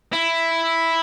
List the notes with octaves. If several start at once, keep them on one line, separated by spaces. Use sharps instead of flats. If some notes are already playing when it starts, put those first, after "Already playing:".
E4